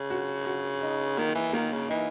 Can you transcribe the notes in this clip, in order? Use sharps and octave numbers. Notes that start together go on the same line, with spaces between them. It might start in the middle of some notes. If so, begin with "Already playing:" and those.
Already playing: C#3
F#4
F#4
D#4
D#3 A#3
E3
D#3 A#3
C#3
E3 D#4